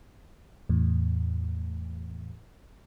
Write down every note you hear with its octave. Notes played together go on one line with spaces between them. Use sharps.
E2 A2